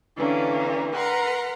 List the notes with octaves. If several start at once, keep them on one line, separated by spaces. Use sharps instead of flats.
D3 E3 G3 A#3 C#4 D4
A#4 B4 F#5 A#5 C6